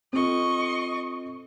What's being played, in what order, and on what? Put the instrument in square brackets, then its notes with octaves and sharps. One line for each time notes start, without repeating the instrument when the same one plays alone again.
[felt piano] C4 F4 A4 [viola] D#5 C#6